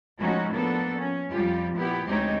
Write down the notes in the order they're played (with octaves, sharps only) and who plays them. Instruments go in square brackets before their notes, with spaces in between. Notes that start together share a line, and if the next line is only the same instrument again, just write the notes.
[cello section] A2 F3 G#3 C#4 D#4 F#4
F3 A#3 B3 D4 A4
C#4
F2 F3 G3 F4 G4
A#2 B3 E4 G4
D2 G#3 C4 D#4 G4 C#5